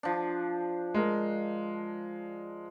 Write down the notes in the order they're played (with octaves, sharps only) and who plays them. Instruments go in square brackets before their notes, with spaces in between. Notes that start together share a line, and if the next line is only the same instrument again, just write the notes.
[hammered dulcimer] F3 D4
[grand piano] G#3 A#4